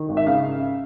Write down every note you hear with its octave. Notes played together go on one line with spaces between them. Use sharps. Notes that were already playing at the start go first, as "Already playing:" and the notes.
Already playing: D#3
G#1
E5
C#3 F5